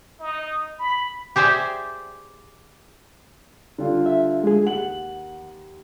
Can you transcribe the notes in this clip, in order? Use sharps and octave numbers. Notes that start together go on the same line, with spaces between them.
D#4
B5
G4 G#4 C5 D5 E5
D3 G3 F4
E5
G#3 G#4
D#2 F#5 F#7